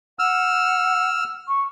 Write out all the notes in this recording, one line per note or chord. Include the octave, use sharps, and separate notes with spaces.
F#5 E6 F6
C#6